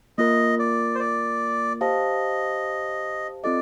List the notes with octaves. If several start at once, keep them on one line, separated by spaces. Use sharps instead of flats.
A#3 F4 A#4 D#5
D5
C5
D5
G4 C5 D#5 F5 A5
C4 F4 A4 D5 D#5